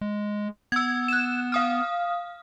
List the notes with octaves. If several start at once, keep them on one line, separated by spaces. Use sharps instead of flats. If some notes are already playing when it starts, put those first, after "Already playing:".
G#3
B3 E6 G#6
F#6 E7
F5 D#6 F6